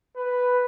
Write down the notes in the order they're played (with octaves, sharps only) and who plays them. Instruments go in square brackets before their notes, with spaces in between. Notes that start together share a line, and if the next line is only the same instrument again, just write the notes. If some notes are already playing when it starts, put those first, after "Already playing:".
[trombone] B4